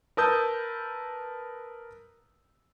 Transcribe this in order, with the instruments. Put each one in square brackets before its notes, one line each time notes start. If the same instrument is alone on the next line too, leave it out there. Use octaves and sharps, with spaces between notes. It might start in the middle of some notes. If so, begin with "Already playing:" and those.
[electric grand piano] A#4 B4 A5 D#6 E6 G6